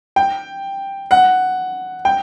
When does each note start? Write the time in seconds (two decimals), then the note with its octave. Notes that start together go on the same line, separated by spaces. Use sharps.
0.16 G5
1.11 F#5
2.05 G5